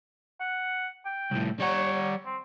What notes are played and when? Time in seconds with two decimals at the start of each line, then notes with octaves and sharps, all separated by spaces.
0.40 F#5
1.06 G5
1.32 C2 A2
1.60 G3 C#5 F#5
2.26 C4